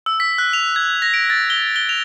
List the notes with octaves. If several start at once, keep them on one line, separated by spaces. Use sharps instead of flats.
E6
B6
F#6
F7
G#6
A#6
D7
A6
G7
G7
F7